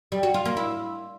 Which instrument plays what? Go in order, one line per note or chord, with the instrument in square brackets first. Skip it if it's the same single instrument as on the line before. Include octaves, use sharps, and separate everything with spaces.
[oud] G3
F#4
F4
A#3
E4